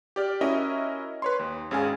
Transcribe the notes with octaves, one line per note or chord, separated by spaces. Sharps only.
G4 D5 F6
C#4 E4 F#4 A#4 D#5 E5
B4 C#5 C6
D#2
G#1 C#4 G#4 F5 G#5